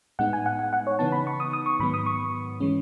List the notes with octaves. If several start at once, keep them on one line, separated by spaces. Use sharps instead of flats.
A2 G#3 B3 D#4 F#5
G#5
F#5
F#5
F#5
C#5
C#3 E3 B3 D#4 A5
B5
C#6
D#6
D#6
C#6
G#2 D#3 F#3 B3 B5
D#6
C#6
E3 G#3 C#4